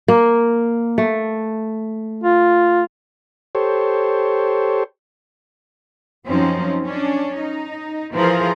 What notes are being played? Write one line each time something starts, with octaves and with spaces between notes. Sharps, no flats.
A#3
A3
F4
G4 A4 C5 C#5
F#2 F3 C4 C#4 D#4
C#4 D4
D#4
E3 F3 F4 G#4 A#4 C5